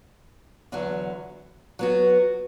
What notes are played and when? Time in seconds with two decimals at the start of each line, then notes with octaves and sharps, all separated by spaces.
0.72 E2 D3 F#3
1.79 F#3 B3 F#4